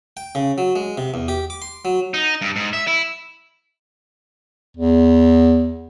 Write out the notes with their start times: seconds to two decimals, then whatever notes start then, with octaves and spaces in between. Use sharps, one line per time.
0.17 G5
0.35 C#3
0.58 F#3
0.76 G#3
0.97 C3
1.14 E2
1.28 G4
1.50 D6
1.62 C6
1.85 F#3
2.14 D#4
2.42 G2
2.56 G#2
2.73 E5
2.87 E4
4.77 E2